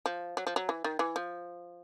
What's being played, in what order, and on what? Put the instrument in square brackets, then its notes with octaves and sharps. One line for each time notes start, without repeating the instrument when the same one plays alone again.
[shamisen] F3
F#3
F3
F#3
E3
D#3
E3
F3